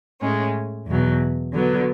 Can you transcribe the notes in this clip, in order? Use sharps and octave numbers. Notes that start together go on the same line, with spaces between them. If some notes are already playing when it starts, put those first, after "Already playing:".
A2 G#3 C#4
E2 B2 F#3
D3 F#3 B3